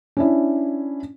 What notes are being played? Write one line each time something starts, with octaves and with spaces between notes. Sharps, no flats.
C#4 D4 E4